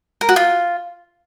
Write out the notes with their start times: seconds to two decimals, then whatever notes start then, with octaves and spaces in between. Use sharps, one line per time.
0.21 A#4
0.29 F#4
0.36 F4